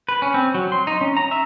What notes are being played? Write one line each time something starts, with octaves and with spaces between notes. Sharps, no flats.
B4
C#4
C4
F#3
C6
D#4
C#4
A#5
E5